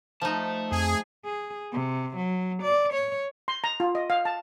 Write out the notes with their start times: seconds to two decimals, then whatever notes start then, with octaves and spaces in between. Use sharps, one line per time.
0.22 F3 A3 D#4 A5
0.72 F2 G#4
1.25 G#4
1.72 C3
2.16 F#3
2.63 D5
2.93 C#5
3.48 C6
3.64 A#5
3.80 F4
3.95 D#5
4.10 F5
4.25 A5